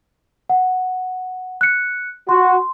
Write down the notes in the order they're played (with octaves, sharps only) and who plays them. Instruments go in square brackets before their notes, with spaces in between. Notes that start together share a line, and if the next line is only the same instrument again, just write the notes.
[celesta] F#5
F#6 C#7
[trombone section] F#4 [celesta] C6